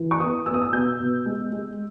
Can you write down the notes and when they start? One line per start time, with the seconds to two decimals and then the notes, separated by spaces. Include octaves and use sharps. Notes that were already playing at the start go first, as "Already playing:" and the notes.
Already playing: E3
0.11 C#6
0.20 B3 D#6
0.46 B3 E6
0.54 D#6
0.62 E6
0.72 B2 G6
1.00 B2
1.26 G#3
1.52 G#3